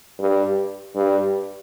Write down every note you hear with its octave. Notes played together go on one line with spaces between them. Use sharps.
G2
G2